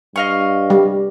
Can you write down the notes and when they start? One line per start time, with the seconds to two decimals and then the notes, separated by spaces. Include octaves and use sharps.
0.16 G2 D#5 F5 C#6
0.70 G3